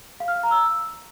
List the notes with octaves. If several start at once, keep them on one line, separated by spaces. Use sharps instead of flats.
F5
F6
F5
A#5
E6